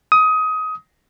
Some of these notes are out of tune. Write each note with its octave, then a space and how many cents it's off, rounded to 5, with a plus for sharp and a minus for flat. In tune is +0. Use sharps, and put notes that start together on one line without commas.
D#6 +20